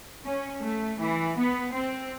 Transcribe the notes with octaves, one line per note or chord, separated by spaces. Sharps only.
C#4
A3
E3
B3
C4